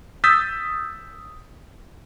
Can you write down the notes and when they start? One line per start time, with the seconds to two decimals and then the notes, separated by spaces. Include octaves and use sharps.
0.24 D#6 E6 G6 A6 B6